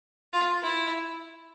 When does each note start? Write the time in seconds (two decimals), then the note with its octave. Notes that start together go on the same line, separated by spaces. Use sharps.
0.33 F4
0.62 E4